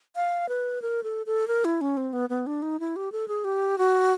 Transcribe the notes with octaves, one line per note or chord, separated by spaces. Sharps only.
F5
B4
A#4
A4
A4
A#4
E4
C#4
C4
B3
B3
D4
D#4
E4
G4
A4
G#4
G4
F#4